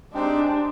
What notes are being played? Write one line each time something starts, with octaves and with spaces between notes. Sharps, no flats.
G#3 C4 D4 D#4 G4 C5